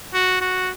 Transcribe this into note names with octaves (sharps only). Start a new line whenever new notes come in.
F#4
F#4